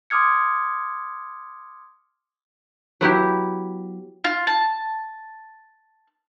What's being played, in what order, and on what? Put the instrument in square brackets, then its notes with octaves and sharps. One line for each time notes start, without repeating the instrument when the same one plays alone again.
[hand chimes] C6 D6 D#6 F6 G#6 C#7
[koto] F#3 B3 E4 G4
[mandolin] F4
A5